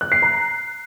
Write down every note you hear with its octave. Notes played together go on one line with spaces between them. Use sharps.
F#6
C7
A#5